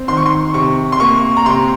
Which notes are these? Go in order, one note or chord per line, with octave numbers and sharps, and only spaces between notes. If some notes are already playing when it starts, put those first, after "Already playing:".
Already playing: C4
D#3 C6
C#6
C6
C3 C#6
C6
A#3 C#6
A#5
C3 C6